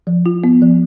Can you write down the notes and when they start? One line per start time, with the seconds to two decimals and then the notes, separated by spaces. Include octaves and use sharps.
0.07 F3
0.26 F4
0.44 B3
0.62 F3